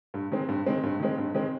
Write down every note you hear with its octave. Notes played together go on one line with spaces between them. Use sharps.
G2
D#3 G#3 C4
G2
D#3 G#3 C4
G2
D#3 G#3 C4
G2
D#3 G#3 C4